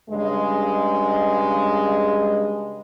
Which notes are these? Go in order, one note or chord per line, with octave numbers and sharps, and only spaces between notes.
G2 C#3 G#3